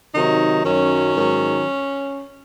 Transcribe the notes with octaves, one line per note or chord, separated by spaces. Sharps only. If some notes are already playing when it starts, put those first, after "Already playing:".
C3 D#3 F#3 D#4
F#2 D#3 F#3 C#4
G#2 D#3 F#3